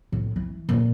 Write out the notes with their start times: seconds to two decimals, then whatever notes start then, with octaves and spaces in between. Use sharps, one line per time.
0.12 A2
0.36 E3
0.69 A#2